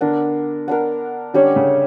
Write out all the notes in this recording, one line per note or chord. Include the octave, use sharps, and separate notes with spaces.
D3 B3 D4 A#4
B3 D4 A#4
D3 G3 C#4 G4 C#5
C#3